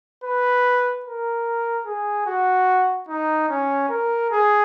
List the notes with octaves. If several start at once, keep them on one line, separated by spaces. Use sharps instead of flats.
B4
A#4
G#4
F#4
D#4
C#4
A#4
G#4